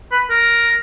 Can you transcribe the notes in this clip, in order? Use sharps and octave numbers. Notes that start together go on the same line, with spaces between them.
B4
A#4